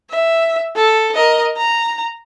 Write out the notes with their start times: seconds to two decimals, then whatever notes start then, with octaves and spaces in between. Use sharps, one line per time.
0.10 E5
0.76 A4
1.14 A#4 D#5
1.57 A#5